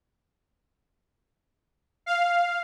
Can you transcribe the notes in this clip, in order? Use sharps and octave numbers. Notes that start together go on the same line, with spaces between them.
F5